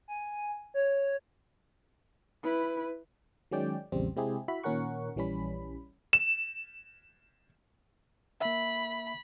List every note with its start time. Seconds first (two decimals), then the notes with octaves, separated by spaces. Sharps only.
0.08 G#5
0.74 C#5
2.44 E4 B4
3.51 D#3 F#3 G#3 C#4 D5 G5
3.92 A#1 E2 C#3 G3 C4
4.16 C3 G#3 C4 E4 G4 G#4
4.48 E4 F#4 E5 B5
4.63 A#2 D#3 C#4 A#4 F#5 C#6
5.16 A#1 E3 G3 C#4 B5
6.13 E7
8.41 A#3 E5 B5